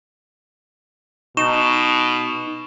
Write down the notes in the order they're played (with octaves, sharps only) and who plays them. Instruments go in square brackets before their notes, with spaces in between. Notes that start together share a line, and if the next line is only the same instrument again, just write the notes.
[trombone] B2 [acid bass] D#4 [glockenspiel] C#6 E7